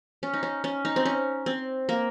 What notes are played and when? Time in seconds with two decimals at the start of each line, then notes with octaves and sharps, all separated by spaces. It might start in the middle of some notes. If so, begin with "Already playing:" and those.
0.23 C#4
0.34 D#4
0.43 C#4
0.64 C#4
0.85 D#4
0.96 C4
1.05 C#4
1.46 C4
1.89 A#3